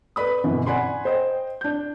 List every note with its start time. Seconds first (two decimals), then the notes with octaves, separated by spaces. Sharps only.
0.16 B4 D5 B5 D#6
0.44 G1 F#2 B2 E3
0.66 D5 F#5 G#5 B5 C6
1.05 C5 D#5 G5
1.61 D4 G6